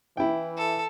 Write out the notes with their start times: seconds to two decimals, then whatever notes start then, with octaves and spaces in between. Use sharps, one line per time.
0.17 E3 E4 G5
0.57 A4